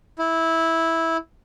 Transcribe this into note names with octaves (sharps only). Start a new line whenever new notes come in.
E4